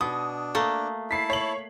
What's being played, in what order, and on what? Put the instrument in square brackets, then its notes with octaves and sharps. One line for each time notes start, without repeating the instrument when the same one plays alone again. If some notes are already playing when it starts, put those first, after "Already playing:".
[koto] B2 [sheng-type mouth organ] D4 [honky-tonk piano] D#6
[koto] A3 A#3
[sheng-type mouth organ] E4 A5 [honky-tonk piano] B6 C7
[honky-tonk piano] C#5 F#7